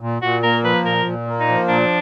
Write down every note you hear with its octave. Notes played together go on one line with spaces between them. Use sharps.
A#2
A#2 F#4
A#3 A#4
F3 B4
A#2 A#4
A#2
A#3
D#4
F3
A#2 D4